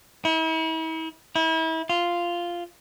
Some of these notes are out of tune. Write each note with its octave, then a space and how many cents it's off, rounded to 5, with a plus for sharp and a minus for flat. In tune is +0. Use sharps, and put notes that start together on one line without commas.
E4 -40
E4 -35
F4 -5